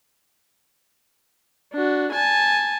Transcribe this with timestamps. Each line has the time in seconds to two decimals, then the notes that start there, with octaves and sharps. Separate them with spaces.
1.74 D4 F#4
2.12 G#5 A5